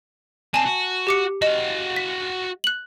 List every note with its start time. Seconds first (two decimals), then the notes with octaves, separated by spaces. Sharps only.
0.54 C4 D4 G#5 A5
0.66 F#4
1.07 G4 D6 C#7
1.42 F#4 D#5 F5
1.96 B6
2.64 F#6 F#7